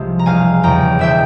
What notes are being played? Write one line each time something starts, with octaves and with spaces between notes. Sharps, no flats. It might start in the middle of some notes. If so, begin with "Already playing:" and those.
Already playing: C2 C3 F3 G#3
A#5
E1 F5 G#5
E2 C#3 G5 A#5
E1 E5 G5